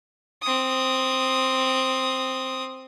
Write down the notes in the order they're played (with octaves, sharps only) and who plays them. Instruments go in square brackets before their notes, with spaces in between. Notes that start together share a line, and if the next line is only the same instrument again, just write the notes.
[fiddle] C4 D#6